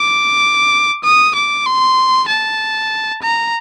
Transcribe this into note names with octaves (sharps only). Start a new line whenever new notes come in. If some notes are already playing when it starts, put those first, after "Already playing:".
Already playing: D6
D#6
D6
C6
A5
A#5